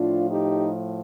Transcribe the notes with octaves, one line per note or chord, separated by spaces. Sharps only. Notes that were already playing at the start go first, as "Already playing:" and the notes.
Already playing: A2 F3 D4 F4
D#4 G4